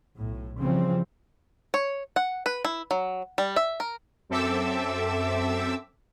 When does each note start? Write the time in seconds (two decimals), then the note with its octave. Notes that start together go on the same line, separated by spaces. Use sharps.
0.15 B1 A2
0.60 C#3 E3 F3 G3 C4
1.74 C#5
2.16 F#5
2.46 B4
2.65 E4
2.91 F#3
3.38 G3
3.56 E5
3.80 A#4
4.29 F#2 C4 A4 E5 D6 E6